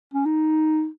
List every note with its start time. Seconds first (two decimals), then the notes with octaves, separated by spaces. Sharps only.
0.14 C#4
0.25 D#4